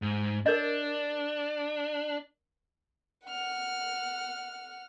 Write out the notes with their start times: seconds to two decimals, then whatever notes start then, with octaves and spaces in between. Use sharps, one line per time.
0.02 G#2
0.46 D4 A#4 C#5 D#5
3.26 F#5 F6